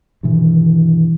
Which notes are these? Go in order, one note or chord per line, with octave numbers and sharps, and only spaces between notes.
G2 B2 D#3 E3